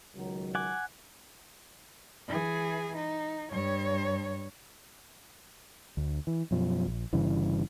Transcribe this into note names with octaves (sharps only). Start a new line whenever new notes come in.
C#2 D#3 F#3
F#5 G#5 D6
E3 G#4
D#4
G2 C#5
D2
E3
F#2 B2 F3
A#1
G1 G2 C#3 E3